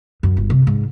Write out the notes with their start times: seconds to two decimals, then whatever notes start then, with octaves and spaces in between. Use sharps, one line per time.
0.23 F#2
0.37 G1
0.50 C3
0.67 G#2